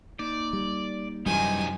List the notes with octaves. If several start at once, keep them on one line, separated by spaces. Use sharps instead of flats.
A#3 D#4 D5
G3
F#2 C3 D#3 E3 G3 G4 D#5 G#5